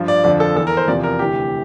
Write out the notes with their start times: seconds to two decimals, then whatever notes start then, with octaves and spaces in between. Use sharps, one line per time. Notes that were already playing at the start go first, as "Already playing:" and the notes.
Already playing: G2 F3
0.08 D5
0.24 F2 D3 F3 D5
0.40 A4
0.55 E2 A4
0.60 E3
0.67 A#4
0.77 C5
0.88 E2 C3 F3 D5
1.03 A#4
1.19 D2 C3 E3 G4